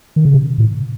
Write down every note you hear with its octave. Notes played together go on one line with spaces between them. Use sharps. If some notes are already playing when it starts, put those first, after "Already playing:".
D#3
C#3
C3
A2